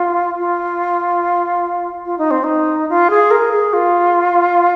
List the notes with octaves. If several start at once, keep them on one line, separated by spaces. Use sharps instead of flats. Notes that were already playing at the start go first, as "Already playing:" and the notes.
Already playing: F4
F4
F4
D#4
C4
D#4
F4
G#4
A#4
G#4
F4